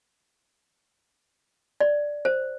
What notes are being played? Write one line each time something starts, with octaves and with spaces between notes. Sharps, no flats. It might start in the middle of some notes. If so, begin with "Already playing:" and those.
D5
C5